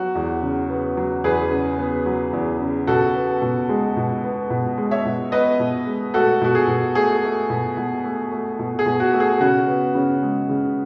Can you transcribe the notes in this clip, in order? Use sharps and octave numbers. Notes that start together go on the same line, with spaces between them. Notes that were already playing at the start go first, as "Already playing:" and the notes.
Already playing: F#3 B3 F#4
E2
C#3
B3
F#3
E2 G#4 B4
C#3
B3
F#3
E2
C#3
B2 F#4 A4
B3
B2
G#3
B2
B3
B2
G#3
C#5 E5
B2
B3 B4 D#5
B2
G#3
A3 F#4 A4
B2 F#4
G#4
B2
A3 G#4
A3
B2
B2
A3
A3
B2
G#4
B2
F#4
A3
G#4
C#3 F#4
B3
C#3
G#3
C#3